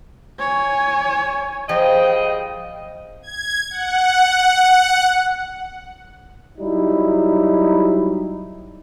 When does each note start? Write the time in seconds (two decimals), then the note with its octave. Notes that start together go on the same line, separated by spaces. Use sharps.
0.39 C#5 G#5
1.69 F3 G3 G#4 D#5 G5
3.22 G#6
3.70 F#5
6.59 F#3 G3 D#4 E4